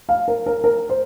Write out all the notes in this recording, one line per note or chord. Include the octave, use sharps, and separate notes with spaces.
F5
A#4
A#4
A#4
C5